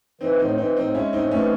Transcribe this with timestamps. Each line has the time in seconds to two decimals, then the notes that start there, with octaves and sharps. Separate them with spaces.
0.21 E3 C4 D#4
0.39 A2 C4 D#4
0.58 E3 C4 D#4
0.76 A2 C4 D#4
0.94 G#3 C#4 E4
1.13 A2 C4 D#4
1.31 E3 A3 C#4